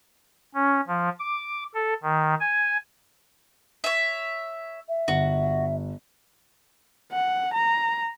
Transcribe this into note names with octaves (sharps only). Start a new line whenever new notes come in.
C#4
F3
D6
A4
D#3
G#5
C#5 E5
E5
G1 F#4
F#5
A#5